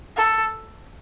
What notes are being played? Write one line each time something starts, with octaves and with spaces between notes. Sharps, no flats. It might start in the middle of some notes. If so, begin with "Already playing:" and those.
A4